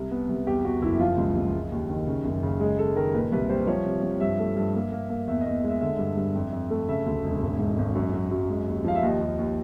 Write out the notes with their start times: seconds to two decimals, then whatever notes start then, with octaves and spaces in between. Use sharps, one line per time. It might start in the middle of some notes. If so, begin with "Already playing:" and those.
Already playing: C2
0.11 B3
0.29 C2
0.47 E2 G4
0.64 E2 F#4
0.82 F#1 E4
1.00 F3 F4
1.17 C#2
1.36 C#2
1.53 G#3
1.72 D#2
1.90 D#3
2.07 C#3
2.25 F#1
2.43 C#3
2.60 G#3 G#4
2.79 G#3 A4
2.96 D#3 A#4
3.14 A#2 B4
3.32 C2 B4
3.49 G3 C5
3.67 F3 C#5
3.85 C3
4.03 F3
4.20 G2 E5
4.39 A3
4.57 G2
4.75 A#3
4.92 A#3
5.10 A#3
5.27 E2 E5
5.41 D#5
5.46 E2
5.64 G#3 E5
5.81 D3 E5
5.99 G2
6.17 G2
6.35 F2
6.52 F2
6.70 A3
6.88 C#3 E5
7.06 D2
7.24 E1
7.41 G#1
7.59 G#2
7.78 G#1
7.95 F#2
8.14 F#3
8.31 F#2
8.49 G#3
8.67 D#2
8.84 F3 F5
8.95 E5
9.03 D#2 D#5
9.21 D#2
9.38 D#2